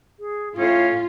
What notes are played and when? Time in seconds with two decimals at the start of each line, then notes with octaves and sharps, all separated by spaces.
0.20 G#4
0.59 A2 C#4 F4 F5